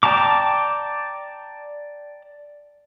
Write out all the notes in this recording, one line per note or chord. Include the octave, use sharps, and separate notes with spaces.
D5 G5 A5 A#5 D6